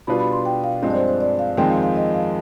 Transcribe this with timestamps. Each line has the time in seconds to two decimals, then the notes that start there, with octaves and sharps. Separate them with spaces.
0.07 B2 G3 D4 F4 B4 B5
0.20 B5
0.32 C6
0.45 G5
0.64 F5
0.82 G2 F3 G#3 C4 D#5
0.90 D5
0.95 C5
1.08 C5
1.21 D5
1.39 F5
1.57 F2 D#3 G#3 C4 G5
1.70 F5
1.83 F5
1.96 D#5
2.14 F5